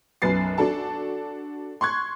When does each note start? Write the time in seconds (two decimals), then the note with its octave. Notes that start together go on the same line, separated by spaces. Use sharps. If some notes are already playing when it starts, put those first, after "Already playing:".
0.22 B1 F#2 B4 A6 C7
0.58 D4 F#4 A4 A5
1.81 C6 C#6 F#6 G#6